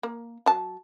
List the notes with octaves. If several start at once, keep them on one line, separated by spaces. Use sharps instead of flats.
A#3
F#3 A5